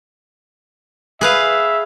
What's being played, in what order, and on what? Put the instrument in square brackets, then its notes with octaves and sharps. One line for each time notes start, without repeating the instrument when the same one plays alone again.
[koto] G#4 B4 F5 [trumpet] E5